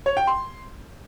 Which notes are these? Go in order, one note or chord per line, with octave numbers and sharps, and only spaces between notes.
C#5
G5
C6